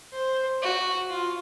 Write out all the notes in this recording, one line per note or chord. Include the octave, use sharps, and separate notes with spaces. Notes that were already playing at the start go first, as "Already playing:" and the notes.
C5
F#4
F4